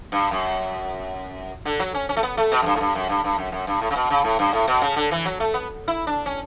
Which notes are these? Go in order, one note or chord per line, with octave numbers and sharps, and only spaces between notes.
G2
F#2
D3
F#3
C#4
C#4
A3
B3
A3
B2
F#2
G2
A2
G2
F#2
G2
G2
F#2
F#2
G2
A2
C#3
B2
C#3
A2
G2
A2
B2
C#3
D3
E3
F#3
A3
B3
E4
D4
C#4